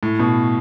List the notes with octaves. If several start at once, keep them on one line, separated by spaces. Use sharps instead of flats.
A2
B2